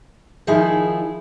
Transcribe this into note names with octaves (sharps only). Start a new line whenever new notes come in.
D#3 F3 D#4 E4 G#4